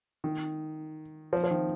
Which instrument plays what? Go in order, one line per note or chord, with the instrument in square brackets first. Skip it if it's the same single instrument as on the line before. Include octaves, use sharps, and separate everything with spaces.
[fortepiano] D#3
F3
F3
D#3